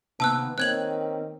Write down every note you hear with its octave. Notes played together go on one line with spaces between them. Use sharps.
C3 D#3 A#3 B3 A5 E6 F#6
D#3 A#3 C4 C#4 F#6 G#6 F#7